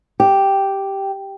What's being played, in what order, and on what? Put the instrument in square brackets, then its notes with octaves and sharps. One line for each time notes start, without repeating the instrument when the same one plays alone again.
[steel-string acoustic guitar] G4